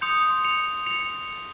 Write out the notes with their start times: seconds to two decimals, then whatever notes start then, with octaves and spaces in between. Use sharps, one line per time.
0.01 C6 D#6 G6 C#7 F7
0.44 C#7 F7
0.86 C#7 F7